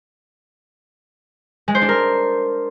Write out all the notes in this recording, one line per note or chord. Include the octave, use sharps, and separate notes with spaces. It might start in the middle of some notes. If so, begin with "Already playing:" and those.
G#3
C5
D4
A#4